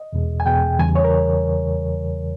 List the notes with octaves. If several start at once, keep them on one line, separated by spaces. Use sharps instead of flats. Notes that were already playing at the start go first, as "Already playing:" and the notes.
Already playing: D#5
E2 B2 G#3
G#5
E2 B2 G#3 G5
E2 C#3 E3 G3 G#5
C#5
A#4